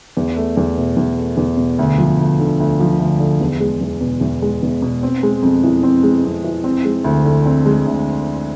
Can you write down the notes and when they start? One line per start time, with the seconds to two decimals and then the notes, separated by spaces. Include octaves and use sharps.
0.17 E2
0.36 A3
0.57 E2
0.77 B2
0.97 E2
1.18 A3
1.37 E2
1.57 B2
1.79 D2
1.98 F3
2.19 D2
2.40 D3
2.60 D2
2.80 F3
2.99 D2
3.20 D3
3.41 E2
3.60 G#3
3.81 E2
4.01 B2
4.21 E2
4.42 G#3
4.63 E2
4.82 B2
5.03 C4
5.23 G#3
5.42 F2
5.64 E3
5.83 C4
6.03 G#3
6.25 F2
6.44 E3
6.64 C4
6.85 G#3
7.04 D2
7.25 D3
7.46 C4
7.66 G#3
7.87 D2